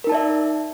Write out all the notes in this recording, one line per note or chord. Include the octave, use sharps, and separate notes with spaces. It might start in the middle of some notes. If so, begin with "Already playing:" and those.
D#4 A#4 D5 E5 A5